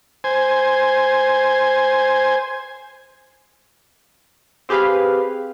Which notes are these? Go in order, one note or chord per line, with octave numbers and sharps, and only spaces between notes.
C5 G#5
C4 G4 G#4 B4 F5